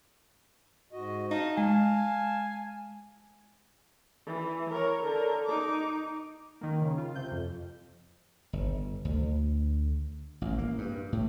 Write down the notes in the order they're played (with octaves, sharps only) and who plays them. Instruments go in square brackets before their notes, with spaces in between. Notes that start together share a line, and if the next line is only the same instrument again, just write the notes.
[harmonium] G#2 F#4 D#5
[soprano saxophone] D#4 [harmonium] F5 A5
[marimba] G#3 [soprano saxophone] G#5
[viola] E3
A#4 C#5
D3 A#4
D#4 D6
[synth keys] D#3 A#3
C#3
F4
C3 G6
F2
[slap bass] G1
D2
A1
A#3
G2
A2